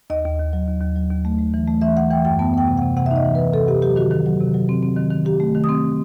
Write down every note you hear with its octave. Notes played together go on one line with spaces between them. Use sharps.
D#2 D#5
D#2
D#2
F#3
D#2
D#2
F#3
D#2
A3
A3
E3
A3
E3 E5
E3 F#5
E3 G5
F#2 G5
B3 A5
B3 G5
C3
F#5
C3
C3 F#5
E5
D#4 D#5
E3
B4
E3
C3 A4
C3 G4
F#3 G4
D#3 F#4
D#3
F#3
C3
F#3
C4
C4
D#3
D#3
D#3 G4
A3
D#3
D#6
C4